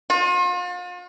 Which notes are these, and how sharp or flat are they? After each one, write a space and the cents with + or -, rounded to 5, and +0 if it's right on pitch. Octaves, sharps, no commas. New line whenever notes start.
F4 +40